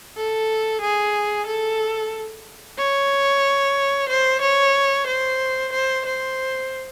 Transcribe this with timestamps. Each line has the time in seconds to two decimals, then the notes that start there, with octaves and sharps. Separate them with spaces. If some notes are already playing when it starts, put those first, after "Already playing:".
0.17 A4
0.81 G#4
1.47 A4
2.78 C#5
4.09 C5
4.42 C#5
5.07 C5
5.72 C5
6.05 C5